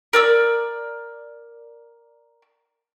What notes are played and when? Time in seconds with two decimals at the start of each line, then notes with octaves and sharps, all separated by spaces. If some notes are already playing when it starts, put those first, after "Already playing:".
0.13 A#4 D5 E6